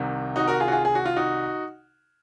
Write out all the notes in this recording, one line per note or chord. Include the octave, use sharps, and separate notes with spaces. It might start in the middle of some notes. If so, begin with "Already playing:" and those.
Already playing: C2 C3 D#3
D#4 F#4
F#4 A#4
F4 G#4
F#4
F4 G#4
G#4
F#4
F4
D#4 F#4